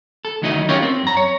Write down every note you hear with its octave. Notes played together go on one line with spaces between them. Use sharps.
A4
D2 D#3 F#3 D#4 E4 D#5
C#4 D#4 F4 G4 A#4 C#5
C4
F#2 A#5
C#5